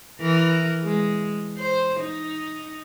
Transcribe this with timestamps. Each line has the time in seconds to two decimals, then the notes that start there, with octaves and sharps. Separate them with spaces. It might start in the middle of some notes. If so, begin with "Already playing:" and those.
0.20 E3 A#4
0.83 G#3
1.58 C5
2.00 D#4